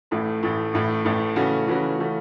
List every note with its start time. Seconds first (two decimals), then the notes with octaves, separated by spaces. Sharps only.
0.11 A1 A2 A3
0.43 A1 A2 A3
0.73 A1 A2 A3
1.05 A1 A2 A3
1.36 C#3 E3 A3 C#4 F#4
1.67 C#3 E3 A3 C#4 F#4
1.98 C#3 E3 A3 C#4 F#4